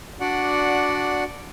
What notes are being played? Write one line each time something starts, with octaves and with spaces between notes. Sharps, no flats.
D4 F#4 D5 F#5